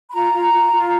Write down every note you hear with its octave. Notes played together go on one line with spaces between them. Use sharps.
B5
F4 A#5
F4
F4
F4